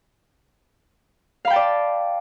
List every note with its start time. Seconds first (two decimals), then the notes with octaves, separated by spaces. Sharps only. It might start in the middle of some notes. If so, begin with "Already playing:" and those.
1.45 F5
1.47 B5
1.50 G5
1.53 A5
1.56 D5